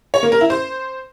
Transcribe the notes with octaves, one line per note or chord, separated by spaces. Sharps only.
C#5
A#3
A#4
E4
C5